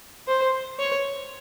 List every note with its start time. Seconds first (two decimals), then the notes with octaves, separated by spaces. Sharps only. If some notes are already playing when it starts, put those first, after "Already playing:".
0.28 C5
0.79 C#5